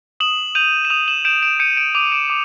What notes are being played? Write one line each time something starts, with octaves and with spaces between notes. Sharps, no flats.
D#6 E7 F#7
G6 D#7 F7
E7
D#6 D#7 F7
E7 F#7
G6 D7 E7
D7 E7
G6 C#7 D#7
D7 E7
D6 D#7 F7
D7 E7
D6